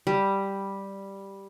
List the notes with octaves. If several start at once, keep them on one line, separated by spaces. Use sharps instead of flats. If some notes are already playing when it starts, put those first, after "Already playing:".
G3